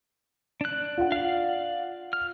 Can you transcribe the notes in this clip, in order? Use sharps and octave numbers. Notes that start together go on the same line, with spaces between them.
D4 F#6
F4 F#5
D5 F5
F6